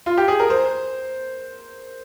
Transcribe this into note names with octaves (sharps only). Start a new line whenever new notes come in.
F4
G4
G#4
A#4
C5